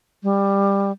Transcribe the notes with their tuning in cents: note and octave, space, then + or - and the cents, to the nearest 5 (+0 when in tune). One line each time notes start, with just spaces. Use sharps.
G3 +15